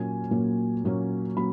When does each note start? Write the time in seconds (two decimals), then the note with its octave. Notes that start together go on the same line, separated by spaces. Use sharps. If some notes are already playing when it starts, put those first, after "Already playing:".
Already playing: A#2 F#3 A#3 C#4 G#5
0.31 A#2 F#3 A#3 C#4
0.84 A#2 F#3 A#3 C#4
1.37 F#3 A#3 C#4 B5